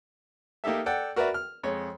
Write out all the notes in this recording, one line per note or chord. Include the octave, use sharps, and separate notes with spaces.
A#3 D#4 G4 A4 E5
A4 D5 F#5 G5
F#4 A#4 B4 D5 E5
F6
F2 G#3 C#5